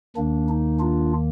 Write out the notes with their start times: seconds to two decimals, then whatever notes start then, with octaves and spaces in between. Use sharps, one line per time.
0.16 D#2 D#3 A#3 D4
0.49 D#4
0.80 D4 F4